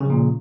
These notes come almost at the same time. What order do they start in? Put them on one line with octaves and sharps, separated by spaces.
C#3 F3 A#2